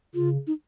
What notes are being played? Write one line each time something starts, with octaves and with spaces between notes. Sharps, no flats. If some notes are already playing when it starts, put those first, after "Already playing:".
C#3 F4
D#4